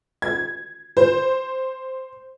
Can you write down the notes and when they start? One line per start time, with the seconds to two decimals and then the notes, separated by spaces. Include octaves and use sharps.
0.22 G#6
0.97 C5